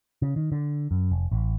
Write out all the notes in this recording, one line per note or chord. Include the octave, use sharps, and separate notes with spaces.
C#3
D#3
D3
F#2
F1
A1